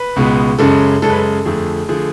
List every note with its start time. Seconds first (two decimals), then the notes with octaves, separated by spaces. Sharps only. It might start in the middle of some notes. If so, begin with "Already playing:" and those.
Already playing: B4
0.16 C#2 B2 G#3 B3
0.59 F#2 C#3 G#3 A4
1.02 F#2 C#3 G#3 A4
1.10 B4
1.17 A4
1.46 F2 D3 F3 A3 G#4
1.89 D3 F3 A3 G#4